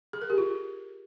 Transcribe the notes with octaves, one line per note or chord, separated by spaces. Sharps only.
G#4
A#4
G4
F4